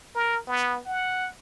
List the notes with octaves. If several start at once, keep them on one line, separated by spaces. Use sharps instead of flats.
A#4
B3
F#5